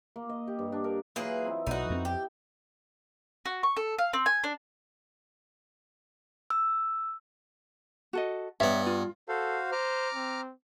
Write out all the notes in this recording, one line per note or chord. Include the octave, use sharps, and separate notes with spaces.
A#3
D#5
G4
G2
D4
A#4
E3 F#3 A#3 F4 G#4 B4
C4 D#4 E4
B1 B3 D#4 F#4
F2 A#3 C4
G4
F#4
C#6
A4
F5
C4
G#5
D4
E6
F#4 A4 D#5
G2 B3 C#5 E5
F4
F#4 A4 C5 F5
C5 A#5 D6 F6
C4